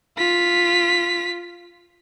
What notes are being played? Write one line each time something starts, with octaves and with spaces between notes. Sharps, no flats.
F4 B6